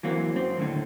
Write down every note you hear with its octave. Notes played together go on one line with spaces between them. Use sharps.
E3 F#3 A#3 C4
F#2 C4
D#2 A2 D3